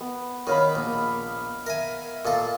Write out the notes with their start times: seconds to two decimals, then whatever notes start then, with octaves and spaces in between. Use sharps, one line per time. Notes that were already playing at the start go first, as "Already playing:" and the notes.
0.01 B3
0.47 D#3 C#5 D#5 F5 B5
0.75 A#1 A#3
1.67 A#4 E5 G#5
2.25 A#2 A4 D#5 F5